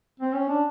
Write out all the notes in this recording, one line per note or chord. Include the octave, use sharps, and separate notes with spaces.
C4
C#4
D4